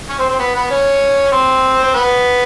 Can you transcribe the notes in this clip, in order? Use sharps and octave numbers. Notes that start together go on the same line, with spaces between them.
C#4 C#5
C4 C5
C4 C5
B3 B4
B3 B4
C#4 C#5
C4 C5
C5
B3 B4